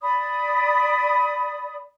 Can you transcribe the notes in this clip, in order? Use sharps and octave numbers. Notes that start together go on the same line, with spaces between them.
D5 B5 D#6